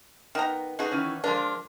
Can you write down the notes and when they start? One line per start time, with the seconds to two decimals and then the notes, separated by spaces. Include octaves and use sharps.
0.35 D#3 B3 A#5
0.79 B2 D#4 F#4 G#4
0.91 D#3 E3 C#4
1.24 F3 G#3 D4 A#4